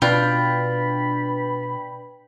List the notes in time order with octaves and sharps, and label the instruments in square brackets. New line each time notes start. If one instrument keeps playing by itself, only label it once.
[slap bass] B2 [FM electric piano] D4 B4 G5 [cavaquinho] F4 [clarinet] B5